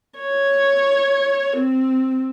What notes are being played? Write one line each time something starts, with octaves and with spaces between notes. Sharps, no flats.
C#5
C4